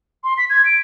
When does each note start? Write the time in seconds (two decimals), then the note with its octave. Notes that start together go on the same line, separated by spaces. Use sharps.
0.24 C6
0.37 B6
0.50 G#6
0.66 D7